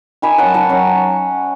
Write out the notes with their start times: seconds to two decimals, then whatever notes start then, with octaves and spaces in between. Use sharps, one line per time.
0.22 D#3 G#5 B5
0.38 F#3 C#4 F#5 A5
0.54 D#3 F#5 A5
0.70 F#3 C#4